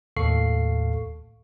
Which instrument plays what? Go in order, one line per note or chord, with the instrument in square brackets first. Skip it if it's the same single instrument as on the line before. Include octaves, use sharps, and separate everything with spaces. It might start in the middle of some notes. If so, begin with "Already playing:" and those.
[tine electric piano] D#2 A2 A4 F5 C#6 C7